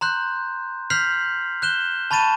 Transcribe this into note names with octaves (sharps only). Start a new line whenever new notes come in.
A#5 C6 F#6 G6
F6 G6 B6 C7 F7 F#7
F#6 G6 E7 G7
A5 B5 C#6 A6 D#7 E7